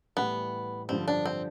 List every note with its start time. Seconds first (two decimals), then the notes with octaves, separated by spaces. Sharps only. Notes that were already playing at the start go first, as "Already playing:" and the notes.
0.17 A2 E3 G3 B3
0.89 G2 D3 F3 C4
1.08 D4
1.25 C4